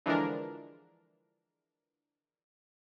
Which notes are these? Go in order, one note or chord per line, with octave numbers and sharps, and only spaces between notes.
D3 E3 F3 G#3 D4 A#4